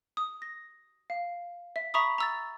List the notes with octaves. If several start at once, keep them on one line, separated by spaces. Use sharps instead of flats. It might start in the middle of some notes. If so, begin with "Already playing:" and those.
D#6
A#6
F5
E5
E5 A#5 B5 C#6 D#6
A#5 E6 A6